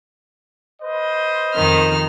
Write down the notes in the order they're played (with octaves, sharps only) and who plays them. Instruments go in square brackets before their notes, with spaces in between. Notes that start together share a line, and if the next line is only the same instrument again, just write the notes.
[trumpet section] B4 C5 D#5
[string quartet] F2 D#3 F6